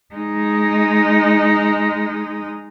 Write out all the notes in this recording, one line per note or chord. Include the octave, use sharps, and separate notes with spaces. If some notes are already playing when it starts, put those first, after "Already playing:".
G#3 D#4